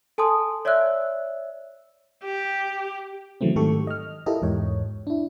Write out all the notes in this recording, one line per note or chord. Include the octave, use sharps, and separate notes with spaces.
A4 G#5 A5 C6 D#6
C#5 D5 E5 E6 F#6
G4
C#3 E3 F#3 A3 C4
G#2 D#3 A3 G4 A4 C#6
D#5 F6
E4 F4 G4 A4 A#4 D#5
E2 G#2 C#5
D4 E4